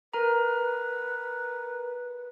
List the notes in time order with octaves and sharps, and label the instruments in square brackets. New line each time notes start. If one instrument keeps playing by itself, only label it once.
[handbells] A#4 A#5 [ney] B4